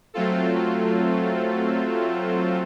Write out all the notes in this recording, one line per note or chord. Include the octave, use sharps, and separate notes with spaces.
F#3 A3 C4 F4 A4